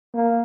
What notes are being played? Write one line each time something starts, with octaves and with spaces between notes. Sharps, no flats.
A#3